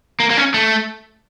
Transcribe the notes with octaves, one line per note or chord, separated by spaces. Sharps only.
A#3
A#3
C#4
A3